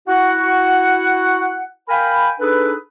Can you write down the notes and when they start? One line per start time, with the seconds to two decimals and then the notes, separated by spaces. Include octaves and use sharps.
0.08 E4 F#4 F#5
1.89 A#4 F5 G5 G#5 B5
2.40 D4 D#4 G#4 A4 B4